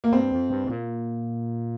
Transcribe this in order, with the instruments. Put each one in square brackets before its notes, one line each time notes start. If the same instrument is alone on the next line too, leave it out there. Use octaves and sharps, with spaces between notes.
[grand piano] A#3
[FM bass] G2 [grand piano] C4
[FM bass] F2
G2
G#2
A#2